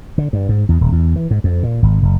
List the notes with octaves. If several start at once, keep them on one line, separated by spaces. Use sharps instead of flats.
D3
G2
G#2
E2
D#1
E2
E3
G#2
F2
A#2
G#1
F#1